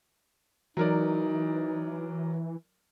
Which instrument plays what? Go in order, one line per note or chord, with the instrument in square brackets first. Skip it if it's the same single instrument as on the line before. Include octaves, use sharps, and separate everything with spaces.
[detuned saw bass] E3 [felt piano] F#3 A#4 D5 [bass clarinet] D#4